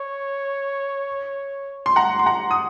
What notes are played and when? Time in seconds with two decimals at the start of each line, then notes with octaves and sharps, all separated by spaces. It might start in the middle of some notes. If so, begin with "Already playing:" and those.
Already playing: C#5
1.86 C6
1.96 F#5 A#5
2.19 C6
2.26 F#5 A#5
2.51 D#6